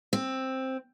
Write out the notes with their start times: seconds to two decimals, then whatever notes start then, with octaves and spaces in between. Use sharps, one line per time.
0.13 C4